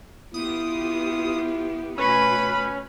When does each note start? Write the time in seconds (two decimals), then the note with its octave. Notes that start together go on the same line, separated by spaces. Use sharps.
0.34 B3 E4 F4 G4 D#6
1.98 B2 A3 C#4 F#4 B4 B5